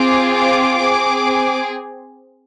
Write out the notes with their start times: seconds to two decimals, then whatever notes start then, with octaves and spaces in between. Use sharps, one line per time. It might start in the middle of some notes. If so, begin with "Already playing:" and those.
Already playing: C4 F4 G#4 D6
0.35 D6
0.79 C4 G#4